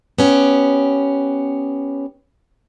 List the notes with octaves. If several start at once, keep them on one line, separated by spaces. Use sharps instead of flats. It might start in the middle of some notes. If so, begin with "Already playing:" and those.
B3 C#4 G4